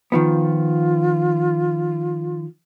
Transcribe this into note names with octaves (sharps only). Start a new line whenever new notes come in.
D#3 F3 B3 F4